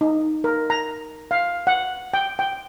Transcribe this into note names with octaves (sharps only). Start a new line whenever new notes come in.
D#4
A#4
A#5
F5
F#5
G5
G5